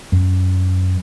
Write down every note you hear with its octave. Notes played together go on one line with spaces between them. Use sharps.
F#2